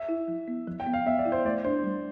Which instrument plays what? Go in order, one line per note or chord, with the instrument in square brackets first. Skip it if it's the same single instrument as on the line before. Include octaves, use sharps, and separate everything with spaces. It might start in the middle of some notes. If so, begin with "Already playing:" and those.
Already playing: [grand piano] E5
[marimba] E4
F3
B3
F3
[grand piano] G5
[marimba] B3
[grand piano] F5
[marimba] B3 [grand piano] E5
[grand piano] D5
[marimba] E4
[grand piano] C5
[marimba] A3 [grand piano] D5
[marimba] D4 [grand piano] C5
[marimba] G3